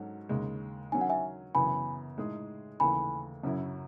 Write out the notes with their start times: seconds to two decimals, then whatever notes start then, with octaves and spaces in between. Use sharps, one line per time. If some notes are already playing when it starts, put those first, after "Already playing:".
Already playing: G#2 F#3 C#4 F#4 A4
0.29 D#2 C#3 G#3
0.92 D#3 F#3 C#4 G#5
1.01 F#5
1.10 E5 G#5
1.55 F#2 C#3 E3 B3 G#5 B5
2.18 A2 G#3 D#4 G#4
2.80 D#2 C#3 E3 A3 G#5 B5
3.43 F#2 C#3 F#3 C#4 E4